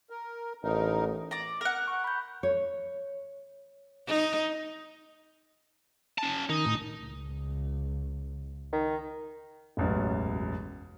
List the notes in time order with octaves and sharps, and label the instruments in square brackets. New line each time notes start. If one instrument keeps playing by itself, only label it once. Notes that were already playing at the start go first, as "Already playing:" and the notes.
[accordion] A#4
[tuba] A1 [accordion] A2 D#4 A#4
[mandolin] D5 A#5
A#4 F#5
[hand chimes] C#6
B5 G6
[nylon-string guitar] C#5
[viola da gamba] D#4
[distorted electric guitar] C#4 A5
[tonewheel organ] D#3 [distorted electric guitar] D#4
[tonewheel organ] A2
[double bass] C#2
[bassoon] D#3
[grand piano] E1 A1 F#2